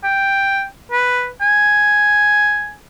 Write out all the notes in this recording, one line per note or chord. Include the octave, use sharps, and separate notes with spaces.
G5
B4
G#5